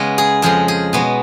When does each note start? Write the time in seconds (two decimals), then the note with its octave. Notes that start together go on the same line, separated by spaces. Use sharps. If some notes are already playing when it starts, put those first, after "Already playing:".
Already playing: C#3 G#3 B3
0.18 G#4
0.42 F2 F3 G#3 G#4
0.68 G#4
0.93 B2 G#3 B3